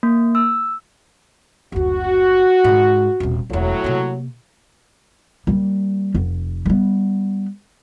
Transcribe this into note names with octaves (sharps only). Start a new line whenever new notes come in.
A#3
E6
F#1 D2 F#4
G#2 G#3
D#1 C3
E1 D2 A2 F#3
C3 A#3
G3 A#3
F1
G3 B3